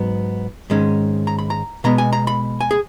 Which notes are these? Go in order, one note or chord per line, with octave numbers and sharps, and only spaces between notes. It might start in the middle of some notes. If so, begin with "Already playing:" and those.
Already playing: G#2 F#3 B3
G#2 D#3 G#3 C#4
A#5
B5
A#5
B2 G#3 B3 A#5
G#5
A#5
B5
G#5
G#4